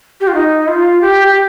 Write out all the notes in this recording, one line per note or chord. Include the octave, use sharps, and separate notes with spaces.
G4
F4
D#4
F4
G4
G4